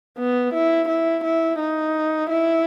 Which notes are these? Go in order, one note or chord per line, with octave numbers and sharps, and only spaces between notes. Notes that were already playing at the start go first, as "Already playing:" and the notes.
B3
E4
E4
E4
D#4
E4